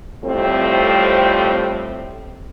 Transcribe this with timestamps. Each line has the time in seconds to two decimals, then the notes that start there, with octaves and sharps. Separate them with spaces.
0.24 F2 A2 G3 C4